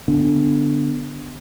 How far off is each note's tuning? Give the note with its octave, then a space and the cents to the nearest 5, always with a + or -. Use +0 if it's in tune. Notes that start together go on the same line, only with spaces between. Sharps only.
D3 +0 B3 +0 D4 +0